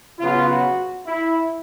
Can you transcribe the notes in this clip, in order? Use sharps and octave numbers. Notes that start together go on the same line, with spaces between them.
C#3 F#3 B3 F4
F#4
E4